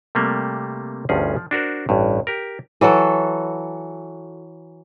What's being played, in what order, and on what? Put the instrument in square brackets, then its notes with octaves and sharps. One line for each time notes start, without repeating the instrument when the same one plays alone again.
[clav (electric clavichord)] C3 G3 A3 A#3
G1 D2 G2 F3 C#4 G#4
F3
D4 F#4 A#4 C5
A1 G2
G4 A#4
[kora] E3 F#3 F#4 A4